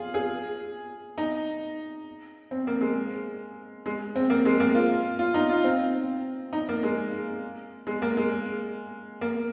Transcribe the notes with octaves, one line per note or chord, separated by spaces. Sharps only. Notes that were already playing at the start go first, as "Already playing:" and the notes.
Already playing: F4 G#4
G#4
D#4
C4
A#3
G#3
G#3
C4
A#3
G#3
A#3
F4
F4
D#4
F4
C4
D#4
A#3
G#3
G#3
A#3
G#3
A#3